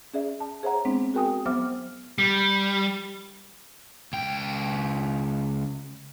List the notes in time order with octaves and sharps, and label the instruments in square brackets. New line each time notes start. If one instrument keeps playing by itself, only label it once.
[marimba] C#4 G#4 D5 E5
A5
G#4 C5 C#5 E5 F#5 A#5
G#3 B3 C4 D4
F#4 G#4 A#4 G5 G#5 D#6
F#3 B3 C5 E5 D6 F6
[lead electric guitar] G3
[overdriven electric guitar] C#2 G5